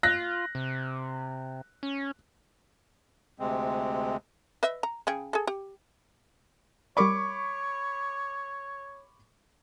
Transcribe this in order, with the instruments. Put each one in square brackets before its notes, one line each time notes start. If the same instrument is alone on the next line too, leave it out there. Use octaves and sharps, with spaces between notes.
[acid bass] F4 [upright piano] F#6 A#6
[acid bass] C3
C#4
[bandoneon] D2 C3 G#3 C4
[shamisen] B4 D#5 E5
A#5
C#3 G#4 G5
G#4 A4
G4
[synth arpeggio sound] G3 A#4 D5 [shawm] C#5 [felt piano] B5 C#6 D6